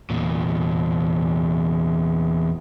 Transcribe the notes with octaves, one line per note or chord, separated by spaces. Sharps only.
E2 A#2